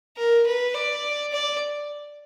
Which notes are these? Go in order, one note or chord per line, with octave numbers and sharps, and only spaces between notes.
A#4
B4
D5
D5